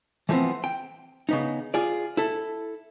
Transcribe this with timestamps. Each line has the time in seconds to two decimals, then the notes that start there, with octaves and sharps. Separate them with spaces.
0.29 E3 F3 A3 B3 C4
0.64 G5
1.29 C#3 B3 D#4
1.74 F4 G#4 D5
2.17 E4 A4